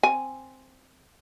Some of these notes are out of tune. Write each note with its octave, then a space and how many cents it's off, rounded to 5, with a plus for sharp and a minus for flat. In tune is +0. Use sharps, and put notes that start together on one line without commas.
C4 +0 G#5 +0